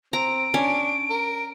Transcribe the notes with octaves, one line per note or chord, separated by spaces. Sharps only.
C4 A#5 D7
C#4 D4
A#4